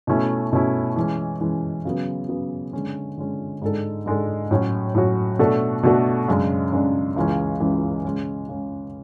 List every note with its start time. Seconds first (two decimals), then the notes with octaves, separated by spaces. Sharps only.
0.07 B2 A3 C#4 E4
0.53 B2 A3 C#4 E4
0.96 E3 G#3 C#4
1.41 E3 G#3 C#4
1.85 C#3 F#3 B3
2.29 C#3 F#3 B3
2.73 D3 G#3 C#4
3.18 D3 G#3 C#4
3.62 G#2 G#3 D4 A4
4.06 G#2 G#3 D4 A4
4.51 A2 F#3 C#4 F#4
4.95 A2 F#3 C#4 F#4
5.39 B2 A3 D4 F#4 A4
5.83 B2 A3 D4 F#4 A4
6.28 F#2 C#3 G#3 D4
6.72 F#2 C#3 G#3 D4
7.16 C#2 C#3 E3 G#3 C#4
7.60 C#2 C#3 E3 G#3 C#4
8.05 C#3 G#3 C#4
8.49 C#3 G#3 C#4